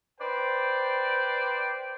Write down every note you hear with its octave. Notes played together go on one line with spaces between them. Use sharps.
B4 C5 D5 G5